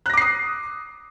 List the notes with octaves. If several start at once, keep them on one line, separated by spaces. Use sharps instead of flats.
D6 D#6 F#6 A#6 C7